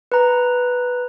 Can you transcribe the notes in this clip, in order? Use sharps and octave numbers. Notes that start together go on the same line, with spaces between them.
B4 A#5